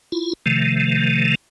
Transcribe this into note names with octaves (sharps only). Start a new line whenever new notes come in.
E4 F4
C3 D#3 F3 A3